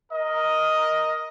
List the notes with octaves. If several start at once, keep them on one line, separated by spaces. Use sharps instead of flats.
A#4 D#5